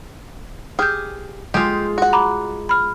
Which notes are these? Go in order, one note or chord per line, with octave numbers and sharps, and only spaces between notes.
G4 G#4 F6 G6
G#3 F4 G4 G#4
F#4 F#5
A#5 B5 D6
B5 F6